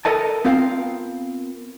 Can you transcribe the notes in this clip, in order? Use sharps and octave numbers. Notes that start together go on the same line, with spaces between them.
A4 A#4 D#5 A5
B3 C4 F4 A#4 F5